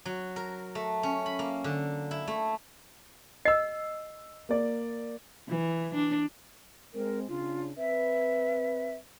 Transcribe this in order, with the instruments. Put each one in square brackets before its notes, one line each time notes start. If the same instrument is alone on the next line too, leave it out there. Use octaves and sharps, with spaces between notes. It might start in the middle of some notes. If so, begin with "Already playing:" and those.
[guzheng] F#3
A#4
A3
C#4
B5
A#3
D3
E4
A3
[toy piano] D#5 [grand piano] E6 C7
[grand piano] A#3 D5
[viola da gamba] E3
D4
[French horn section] G#3 C4 [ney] A#4
[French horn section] C#3 D4 [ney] F4
[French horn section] C4 B4 [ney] E5